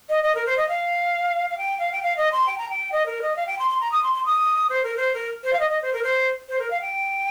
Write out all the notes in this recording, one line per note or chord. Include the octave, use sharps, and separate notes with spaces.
D#5
D#5
A#4
C5
D#5
F5
F5
G5
F5
G5
F5
D#5
C6
G5
A#5
G5
D#5
A#4
D#5
F5
G5
C6
C6
A#5
D#6
C6
C6
D#6
C5
A#4
C5
A#4
C5
F5
D#5
D#5
C5
A#4
C5
C5
A#4
F5
G5